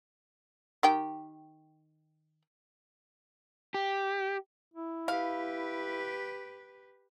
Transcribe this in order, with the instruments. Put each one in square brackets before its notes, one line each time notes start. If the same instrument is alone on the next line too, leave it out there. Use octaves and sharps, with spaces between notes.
[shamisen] D#3 G4 G5
[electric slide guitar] G4
[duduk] E4
[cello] G4 B4 [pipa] F5